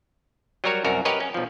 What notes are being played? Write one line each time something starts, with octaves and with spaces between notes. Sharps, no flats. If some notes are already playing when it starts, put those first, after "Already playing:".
F#3 G3 F#4 A#4 C#5
C2 F#2 F#4 A#4
G4 A#4 B4 C#5 D#5
C#4
B1 F3